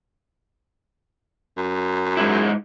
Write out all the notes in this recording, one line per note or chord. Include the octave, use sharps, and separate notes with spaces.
F#2
G#2 G#3 E4